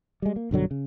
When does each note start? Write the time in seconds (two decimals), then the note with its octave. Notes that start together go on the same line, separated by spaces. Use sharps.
0.22 G3 G#3
0.36 A#3
0.51 B1 G2 D3 F#3
0.71 C#3